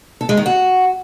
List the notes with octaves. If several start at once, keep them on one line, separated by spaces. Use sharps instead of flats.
A4
G#3
D#3
F#4